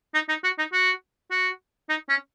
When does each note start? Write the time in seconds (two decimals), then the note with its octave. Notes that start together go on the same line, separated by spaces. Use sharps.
0.14 D#4
0.29 D#4
0.44 F#4
0.59 D#4
0.73 F#4
1.31 F#4
1.89 D#4
2.09 C#4